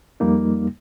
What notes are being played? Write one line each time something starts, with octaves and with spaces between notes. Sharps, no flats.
F2 G3 A#3 D#4